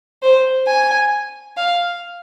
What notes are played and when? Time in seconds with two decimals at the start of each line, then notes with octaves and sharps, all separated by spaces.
0.23 C5
0.68 G#5
1.57 F5